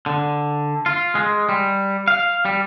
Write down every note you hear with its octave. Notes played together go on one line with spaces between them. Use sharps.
D3
F4
G#3
G3
F5
G3